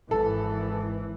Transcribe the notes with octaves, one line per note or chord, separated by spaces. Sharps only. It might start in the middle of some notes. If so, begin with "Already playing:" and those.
G#1 E3 A4